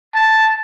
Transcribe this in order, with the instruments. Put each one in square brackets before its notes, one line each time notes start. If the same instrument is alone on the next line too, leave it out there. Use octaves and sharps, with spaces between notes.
[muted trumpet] A5